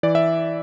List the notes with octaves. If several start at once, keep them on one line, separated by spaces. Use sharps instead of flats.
E3 D5
E5